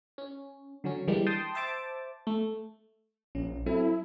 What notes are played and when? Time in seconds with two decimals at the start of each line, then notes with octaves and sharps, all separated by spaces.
0.18 C#4
0.84 D3 F#3 C#4
1.08 E3 G3 G#3 A#3 D4
1.27 G5 A5 C6 D#6
1.55 C5 E5 A5 D6
2.27 A3
3.35 A#1 C#4
3.66 F#3 C4 E4 A4